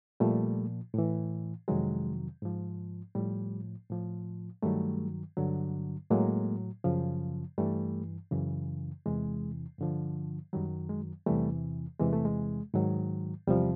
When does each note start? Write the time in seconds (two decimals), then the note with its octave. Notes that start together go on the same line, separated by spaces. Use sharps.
0.20 A#2 F3 G3 A3
0.94 A2 E3
1.68 F2 C3 D#3 F#3 G#3
2.42 G#2 F3
3.15 A2 F3 G3
3.89 A2 F3
4.62 G2 D#3 F#3 G3 A3
5.37 G2 D3 F#3
6.11 A2 F#3 G#3 A#3
6.84 F#2 C#3 F3
7.58 G2 E3 G3 A3
8.32 F#2 C#3 E3
9.06 E2 C3 E3 G#3
9.79 G2 D3 F3
10.53 F#2 D#3 F#3 G3
10.89 G#3
11.26 E2 C3 E3 G3 A3
12.00 E2 C3 E3 G#3
12.13 A3
12.25 G#3
12.74 G#2 D#3 F#3
13.47 E2 C3 F3 G3